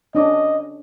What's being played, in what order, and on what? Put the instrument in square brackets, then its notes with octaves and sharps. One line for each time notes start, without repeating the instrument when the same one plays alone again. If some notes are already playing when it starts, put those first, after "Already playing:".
[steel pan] C#4 D4 D6 [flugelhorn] D#5